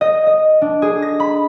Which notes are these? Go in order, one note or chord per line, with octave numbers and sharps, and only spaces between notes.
D#5
D#5
D4
G#4
A#6
B5